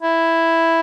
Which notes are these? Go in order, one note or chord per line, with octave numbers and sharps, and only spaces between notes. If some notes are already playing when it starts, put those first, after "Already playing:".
E4